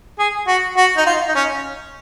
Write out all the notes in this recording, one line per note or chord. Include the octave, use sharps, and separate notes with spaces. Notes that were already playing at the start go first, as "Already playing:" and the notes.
G#4
F#4
F#4
D#4
F4
D#4
C#4